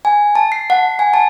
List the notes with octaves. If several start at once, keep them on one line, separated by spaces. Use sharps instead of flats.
G#5
A5
C7
F#5
G#5
A5